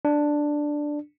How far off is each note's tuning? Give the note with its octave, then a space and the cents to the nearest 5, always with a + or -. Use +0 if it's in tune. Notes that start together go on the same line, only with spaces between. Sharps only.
D4 +5